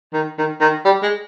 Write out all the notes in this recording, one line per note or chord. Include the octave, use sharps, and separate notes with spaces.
D#3
D#3
D#3
G3
G#3